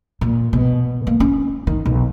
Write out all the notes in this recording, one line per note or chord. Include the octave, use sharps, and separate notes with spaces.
A#2
B2
A#3
C#4
D#3
B1